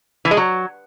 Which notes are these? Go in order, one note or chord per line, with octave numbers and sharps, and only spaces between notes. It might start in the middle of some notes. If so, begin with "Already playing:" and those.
E3
G#3
F#3